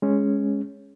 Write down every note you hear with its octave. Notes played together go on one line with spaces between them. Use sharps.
G#3 C#4